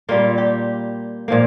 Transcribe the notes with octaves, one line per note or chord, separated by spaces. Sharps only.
A#2 G3 A#3 F4
G4
A#2 F3 A#3